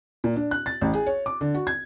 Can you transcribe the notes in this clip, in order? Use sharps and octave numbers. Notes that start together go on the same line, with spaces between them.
A#2
D4
F#6
A6
A1
G#4
C#5
D6
D3
F#4
G#6